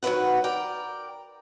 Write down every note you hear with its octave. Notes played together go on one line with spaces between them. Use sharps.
D#3 F#3 F#4 B4 F#5
A#4 D5 G5